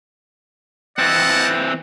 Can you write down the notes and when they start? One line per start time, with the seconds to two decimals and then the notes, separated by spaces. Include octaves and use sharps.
0.99 E3 C4 D#5 F#5 A5